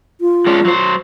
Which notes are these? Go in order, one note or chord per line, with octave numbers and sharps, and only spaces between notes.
F4
G#3 C#4 D4
F#3 C5